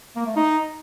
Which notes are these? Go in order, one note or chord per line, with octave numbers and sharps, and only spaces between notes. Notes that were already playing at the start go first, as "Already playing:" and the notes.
A#3
A3
D#4